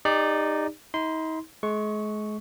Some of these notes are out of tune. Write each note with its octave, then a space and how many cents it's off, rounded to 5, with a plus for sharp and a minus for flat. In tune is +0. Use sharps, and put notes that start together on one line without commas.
D#4 -10 G4 +40 D5 +5
D#4 +40 C6 -15
G#3 +35 C#6 +0